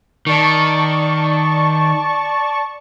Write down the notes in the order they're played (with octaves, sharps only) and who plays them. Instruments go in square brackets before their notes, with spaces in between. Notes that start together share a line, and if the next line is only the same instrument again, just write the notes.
[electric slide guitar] D#3 [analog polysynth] D5 A5 C#6